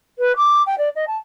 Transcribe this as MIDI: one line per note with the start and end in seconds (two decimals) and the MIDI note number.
0.19 0.36 71
0.36 0.62 86
0.66 0.75 79
0.78 0.89 74
0.96 1.05 75
1.07 1.17 81